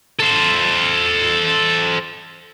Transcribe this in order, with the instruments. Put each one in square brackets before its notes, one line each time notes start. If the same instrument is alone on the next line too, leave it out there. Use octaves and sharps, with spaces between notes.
[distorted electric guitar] A4 C5